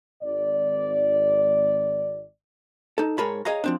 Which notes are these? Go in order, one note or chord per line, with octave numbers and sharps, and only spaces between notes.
G#1 D5
D#4 A4
G#2 G#4 A#4 C#5 A5 B5
G#4 C#5 D#5 F5 A#5
F3 C4 D4